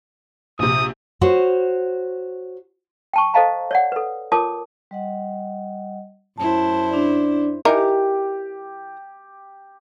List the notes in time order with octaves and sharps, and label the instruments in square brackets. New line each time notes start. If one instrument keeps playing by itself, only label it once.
[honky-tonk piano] A#1 C3 [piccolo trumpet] D#6
[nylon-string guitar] F#4 C5 C#5
[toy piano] G5 A5 C#6
A4 C5 D#5 F5 A5 A#5
C#5 D5 F#5
A4 B4
F4 A#4 C#5 A5 D6 D#6
[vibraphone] G3 D#5 F#5
[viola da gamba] F#2 E4 C5 [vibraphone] A5
[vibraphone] D4 D5
[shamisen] E3 D#4 A#4 [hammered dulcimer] G4